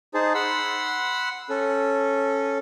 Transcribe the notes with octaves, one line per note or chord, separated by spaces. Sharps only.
D#4 G#4 C5 A5
F#5 B5 C6 E6
C#4 A4